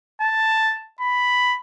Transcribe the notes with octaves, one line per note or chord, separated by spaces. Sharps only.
A5
B5